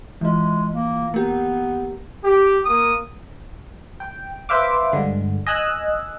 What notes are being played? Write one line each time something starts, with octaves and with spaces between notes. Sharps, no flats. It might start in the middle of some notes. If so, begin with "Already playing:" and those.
E3 G#3 F4
A#3
A#3 B3 G4
G4
A#3 D#6
G5
B4 C5 E5 F5 D6
G2 D3 G#3
D#5 G#5 E6 F#6